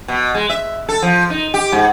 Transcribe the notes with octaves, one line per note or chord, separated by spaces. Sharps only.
B2
G#3
E5
A4
F3
D#4
G4
G#2